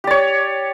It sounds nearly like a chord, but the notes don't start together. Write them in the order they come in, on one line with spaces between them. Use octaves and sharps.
G4 D5 C#5